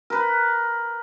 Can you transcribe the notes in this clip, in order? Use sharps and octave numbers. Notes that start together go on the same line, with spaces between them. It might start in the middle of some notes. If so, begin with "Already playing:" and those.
A#4 B4